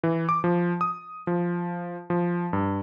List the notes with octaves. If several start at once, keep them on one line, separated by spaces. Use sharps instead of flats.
E3
D6
F3
D#6
F3
F3
G2